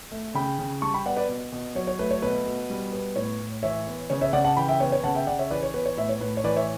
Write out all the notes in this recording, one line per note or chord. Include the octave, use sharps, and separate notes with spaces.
A3
C#3 G5 B5
C#3
G3 A5 C#6
G5 B5
B3 D5 F#5
B4 D5
B2
B2
F#3 C#5
C#5
A3 B4
C#5
B2 B4
B2
G3
B3
A2 C#5
A2
E3 C#5 E5
B3
C#3 C#5
C#5 E5
C#3 D5 F#5
F#5 A5
E3 G5 B5
E5 G5
B3 C#5
C#5
C#3 F#5 A5
E5 G5
C#3 D5 F#5
C#5 E5
E3 B4 D5
C#5
B3 B4
C#5
A2 C#5 E5
C#5
A2 B4
C#5
E3 B4 D5
C#5 E5